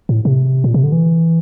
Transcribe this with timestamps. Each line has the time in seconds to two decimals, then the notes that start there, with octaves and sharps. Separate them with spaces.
0.09 A2
0.25 C3
0.64 A#2
0.74 C3
0.84 D3
0.92 E3